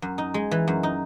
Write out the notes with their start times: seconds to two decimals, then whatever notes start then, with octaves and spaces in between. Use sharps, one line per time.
0.02 F#2
0.18 D#4
0.34 G#3
0.51 E3
0.68 F#2
0.83 D#4